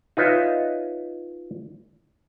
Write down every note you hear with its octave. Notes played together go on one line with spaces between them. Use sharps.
D#4 F4 B4 C#5 D#5 E5